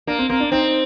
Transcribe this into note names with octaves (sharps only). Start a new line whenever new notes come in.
A#3 D4
C4
A#3 C4
D4
C4 D#4